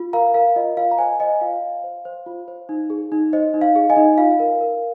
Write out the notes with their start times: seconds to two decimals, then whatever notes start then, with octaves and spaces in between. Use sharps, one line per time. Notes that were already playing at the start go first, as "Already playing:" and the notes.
Already playing: F4
0.13 A#4 F5 A#5
0.34 A#4 F5
0.56 F4 D#5
0.77 F4 F5
0.91 A#5
0.98 C5 D#5 G#5
1.20 C5 D#5 G#5
1.41 F4 F5
1.62 F4
1.84 C5
2.05 C5
2.26 F4
2.48 C5
2.69 D#4
2.90 G#4
3.12 D#4
3.33 C5 D#5
3.54 D#4
3.61 F5
3.76 G#4
3.90 D#5 G#5
3.97 D#4
4.18 F4 F5
4.40 A#4
4.61 A#4